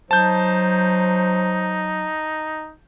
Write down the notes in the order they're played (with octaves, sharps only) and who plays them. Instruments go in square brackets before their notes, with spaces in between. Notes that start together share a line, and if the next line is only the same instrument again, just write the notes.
[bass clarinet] F#3 [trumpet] D#4 [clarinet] C5 [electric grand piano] A5 G6